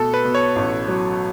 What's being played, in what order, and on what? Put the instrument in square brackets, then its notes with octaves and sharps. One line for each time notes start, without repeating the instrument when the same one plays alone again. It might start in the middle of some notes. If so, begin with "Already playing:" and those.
Already playing: [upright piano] B2 A3 [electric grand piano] A4
[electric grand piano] B4
[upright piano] B2
[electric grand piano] C#5
[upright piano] A1
F#3